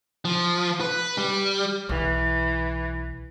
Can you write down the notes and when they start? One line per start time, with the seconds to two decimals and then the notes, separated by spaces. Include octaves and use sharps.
0.25 F3
0.81 B4
1.18 G3
1.89 B1 E3